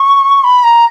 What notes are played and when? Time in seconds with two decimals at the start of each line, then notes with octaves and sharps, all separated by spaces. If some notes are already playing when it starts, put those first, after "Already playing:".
Already playing: C#6
0.44 B5
0.64 A#5